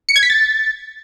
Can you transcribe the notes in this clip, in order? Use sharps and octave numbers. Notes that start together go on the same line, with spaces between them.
C#7
G#6
B6
A6